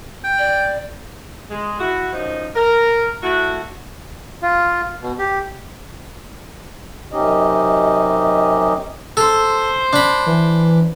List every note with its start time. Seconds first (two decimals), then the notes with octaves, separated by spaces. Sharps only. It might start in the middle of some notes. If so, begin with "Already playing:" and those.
0.24 G5
0.38 D5
1.50 G#3
1.79 E4 F#4
2.13 F#2 D#3 F3 D#4 D#5
2.56 A#4
3.23 A3 E4 F#4
4.42 F4
5.02 B2
5.19 G4
7.13 F#2 C3 C#4 D#4 G4 D#5
9.17 A4 C5
9.93 D4 B5
10.26 E3